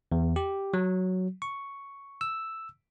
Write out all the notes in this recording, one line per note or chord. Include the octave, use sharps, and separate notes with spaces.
E2
G4
F#3
C#6
E6